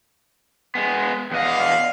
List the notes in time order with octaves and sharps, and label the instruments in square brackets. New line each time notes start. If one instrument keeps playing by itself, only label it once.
[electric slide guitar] G#3 B3
[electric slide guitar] E2 D#5 [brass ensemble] D5 F5 F#5